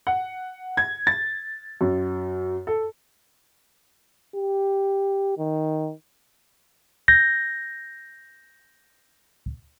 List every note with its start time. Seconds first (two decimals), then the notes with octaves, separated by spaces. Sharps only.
0.07 F#5
0.77 G#6
1.07 A6
1.81 F#2
2.67 A4
4.36 G4
5.38 D#3
7.08 G6 A#6